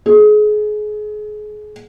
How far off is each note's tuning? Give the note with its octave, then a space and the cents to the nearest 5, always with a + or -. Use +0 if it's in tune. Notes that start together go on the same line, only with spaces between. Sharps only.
G#4 +30